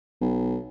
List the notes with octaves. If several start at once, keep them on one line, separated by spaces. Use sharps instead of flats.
B1